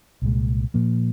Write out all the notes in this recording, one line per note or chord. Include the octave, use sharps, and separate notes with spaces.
C2 A#2 G#3
A#2 F3 A#3